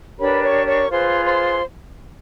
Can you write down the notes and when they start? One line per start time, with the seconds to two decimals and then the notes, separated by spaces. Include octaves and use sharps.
0.19 D4 G4 A#4 B4 C#5 B5
0.43 C#5 C#6
0.66 C#5 C#6
0.90 F4 G#4 B4 C5 C6
1.25 C5 C6